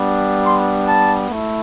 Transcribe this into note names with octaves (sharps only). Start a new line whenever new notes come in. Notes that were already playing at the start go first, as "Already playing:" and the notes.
Already playing: G3 B3 D4
C6
A5
A3 E4